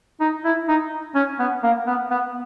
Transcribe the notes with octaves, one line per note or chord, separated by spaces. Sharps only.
D#4
E4
D#4
C#4
B3
A#3
B3
B3